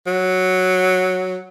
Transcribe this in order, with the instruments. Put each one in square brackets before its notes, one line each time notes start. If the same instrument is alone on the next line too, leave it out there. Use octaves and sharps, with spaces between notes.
[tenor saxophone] F#3